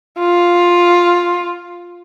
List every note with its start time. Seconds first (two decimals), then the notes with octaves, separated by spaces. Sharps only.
0.19 F4